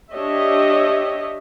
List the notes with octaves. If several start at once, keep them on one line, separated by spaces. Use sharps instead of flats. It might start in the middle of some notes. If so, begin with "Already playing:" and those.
D4 G4 C#5 D#5 E5